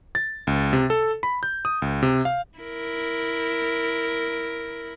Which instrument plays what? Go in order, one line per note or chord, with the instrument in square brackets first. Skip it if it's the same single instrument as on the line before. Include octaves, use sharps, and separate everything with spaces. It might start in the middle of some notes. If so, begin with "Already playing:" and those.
[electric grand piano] A6
C#2
C3
A4
B5
G6
D#6
C#2
C3
F5
[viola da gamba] E4 A#4